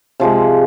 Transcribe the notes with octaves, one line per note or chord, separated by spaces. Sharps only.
C3 F3 G#3